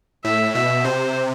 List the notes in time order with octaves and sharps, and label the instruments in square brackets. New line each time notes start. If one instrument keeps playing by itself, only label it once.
[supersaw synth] A2 [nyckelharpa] E5
[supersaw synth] B2 [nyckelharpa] E5
[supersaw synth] C3 [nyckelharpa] C5